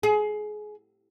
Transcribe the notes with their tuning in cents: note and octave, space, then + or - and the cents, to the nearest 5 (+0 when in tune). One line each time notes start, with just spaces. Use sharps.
G#4 +25